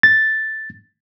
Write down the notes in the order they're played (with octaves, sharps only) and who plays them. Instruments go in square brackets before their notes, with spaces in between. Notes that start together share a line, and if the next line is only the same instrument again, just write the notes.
[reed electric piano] A6